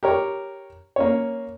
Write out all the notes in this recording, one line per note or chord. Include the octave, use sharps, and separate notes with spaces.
G4 A#4 C#5
A#3 C#4 C#5